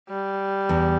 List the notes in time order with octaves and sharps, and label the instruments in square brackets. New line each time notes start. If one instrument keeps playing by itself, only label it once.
[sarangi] G3
[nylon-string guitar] E2